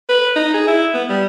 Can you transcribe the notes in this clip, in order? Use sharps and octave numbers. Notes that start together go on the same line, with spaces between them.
B4
D#4
G#4
E4
B3
G3